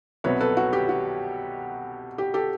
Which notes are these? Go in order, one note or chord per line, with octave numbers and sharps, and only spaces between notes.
C2 B2 F#3 B4 C#5
A4 B4
F#4
G4
F#4
G4
G4 A4